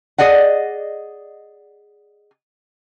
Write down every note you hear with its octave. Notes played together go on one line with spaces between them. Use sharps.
G#4 D5 D#5 F#5